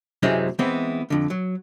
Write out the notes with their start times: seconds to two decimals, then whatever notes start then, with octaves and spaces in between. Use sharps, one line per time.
0.23 F#2 C3 E3 G#3 C4 C#4
0.59 E3 G#3 B3 C4 E4
1.10 F2 D3
1.30 F#3